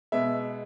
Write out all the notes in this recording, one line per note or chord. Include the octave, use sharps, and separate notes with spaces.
B2 G#3 B3 E5